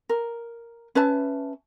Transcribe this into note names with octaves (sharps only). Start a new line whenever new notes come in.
A#4
C#4 B4 E5 A5